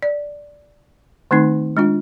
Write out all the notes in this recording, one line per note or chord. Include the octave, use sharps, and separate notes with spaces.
D5
D#3 A3 C4 D#4 C6
G#3 D4 F4